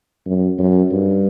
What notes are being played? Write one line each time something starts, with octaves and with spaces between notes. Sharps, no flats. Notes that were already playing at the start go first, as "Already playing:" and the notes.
F#2
F#2
G2